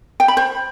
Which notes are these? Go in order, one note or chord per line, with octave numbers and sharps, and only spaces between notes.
G5
B5
C5